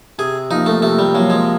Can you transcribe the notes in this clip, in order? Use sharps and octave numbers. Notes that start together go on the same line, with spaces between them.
C3 G#4
F3 A#3 D#4
A3
C3 A3
G3
F3 F#3 A#3
G#3